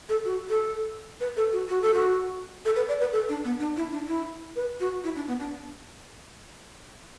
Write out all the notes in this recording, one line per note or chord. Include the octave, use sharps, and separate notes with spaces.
A4
F#4
A4
B4
A4
F#4
F#4
A4
F#4
A4
B4
D5
B4
A4
D4
B3
D4
E4
D4
E4
B4
F#4
E4
D4
B3
D4